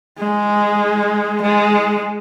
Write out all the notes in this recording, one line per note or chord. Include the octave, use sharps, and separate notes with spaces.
G#3
G#3